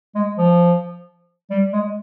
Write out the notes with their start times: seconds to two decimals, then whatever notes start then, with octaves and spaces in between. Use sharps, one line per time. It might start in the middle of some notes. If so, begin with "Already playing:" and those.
0.15 G#3
0.38 F3
1.50 G3
1.73 G#3